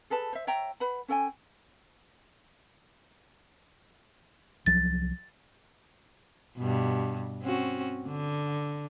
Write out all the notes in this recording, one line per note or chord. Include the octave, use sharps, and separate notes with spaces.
G#4 A4 B4 A5
C5 E5
C#5 E5 G5 A#5
B4 F#5 B5
C#4 A4 G5 G#5
C2 F3 F#3 A6
G2 B2
C4 C#4 F#4
D3